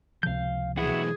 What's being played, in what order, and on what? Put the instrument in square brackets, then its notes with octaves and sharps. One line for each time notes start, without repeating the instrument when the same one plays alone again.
[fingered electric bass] C#2 C3 F3 [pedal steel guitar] F5 G6
[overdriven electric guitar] B1 E3 [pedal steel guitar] E4 F#4 F#5 [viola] G#4